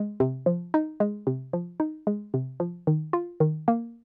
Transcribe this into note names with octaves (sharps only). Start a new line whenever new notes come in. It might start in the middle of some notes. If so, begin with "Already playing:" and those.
Already playing: G#3
C3
F3
D#4
G#3
C3
F3
D#4
G#3
C3
F3
D#3
F4
D#3
A#3